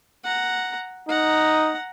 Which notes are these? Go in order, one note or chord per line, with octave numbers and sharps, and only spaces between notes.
F#5 A#5
D#4 F#5 A#5